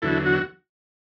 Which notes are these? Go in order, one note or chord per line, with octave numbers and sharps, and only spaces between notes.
E2 D3 F#3 E4 A4
F#4